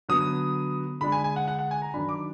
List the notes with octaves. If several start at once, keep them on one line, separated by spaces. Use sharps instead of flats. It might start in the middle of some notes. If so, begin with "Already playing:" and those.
D3 F#3 B3 D#6
D3 G#3 D4 B5
G#5
G#5
F#5
F#5
F#5
G#5
A#5
D#3 F#3 D4 B5
D6